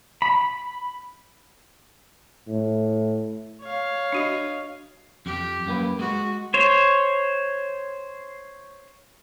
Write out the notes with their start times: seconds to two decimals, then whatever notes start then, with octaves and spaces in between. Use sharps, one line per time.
0.22 B5
2.48 A2
3.61 C#5 F5
4.13 D4 F#4 D#5
5.26 F2 G4
5.67 F#2 A#3 B4
5.99 G#3 F#4
6.54 C5 C#5